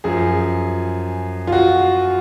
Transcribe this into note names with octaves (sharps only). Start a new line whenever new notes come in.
F#2 F3 G#4
F4
F#4